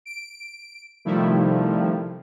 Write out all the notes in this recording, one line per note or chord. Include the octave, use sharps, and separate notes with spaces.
D7
C3 D#3 F3 G3 A3 E4